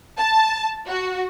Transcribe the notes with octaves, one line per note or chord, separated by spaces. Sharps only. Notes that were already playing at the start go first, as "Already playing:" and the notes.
A5
F#4